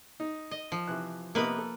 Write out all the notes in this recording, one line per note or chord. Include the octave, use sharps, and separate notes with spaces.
D#4
D#5
F3
C3 E3 F#6
C3 A#3 B3 B4 D#5
A4